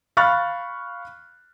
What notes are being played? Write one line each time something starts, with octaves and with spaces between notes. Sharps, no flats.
F5 B5 C#6 F6 F#6 A6